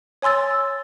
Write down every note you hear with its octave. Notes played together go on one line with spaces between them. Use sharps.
C#5 G#5 C6 E6 A6